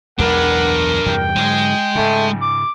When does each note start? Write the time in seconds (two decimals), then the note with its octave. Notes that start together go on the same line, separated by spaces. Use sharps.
0.19 B1 E2 G#3 D4 A#4 B4 F#5
1.06 E2 G2 C3 G5
1.36 G#2 D3 F#3 G#3
1.95 G#2 C#3 A3
2.41 D6